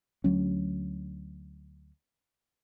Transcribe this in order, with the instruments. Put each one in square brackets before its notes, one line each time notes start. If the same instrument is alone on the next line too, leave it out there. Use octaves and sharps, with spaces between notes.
[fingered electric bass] D2 F#3 C#4